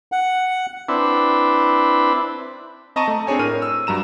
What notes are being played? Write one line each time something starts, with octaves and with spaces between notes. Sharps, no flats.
F#5
C4 D4 E4 B4
C4 D#5 A5 A#5 C#6 D#7
A3
C4 D4 G#4 C#5 G#5
A2 A#4 F6 D#7
E6
G2 F#3 A#5 E7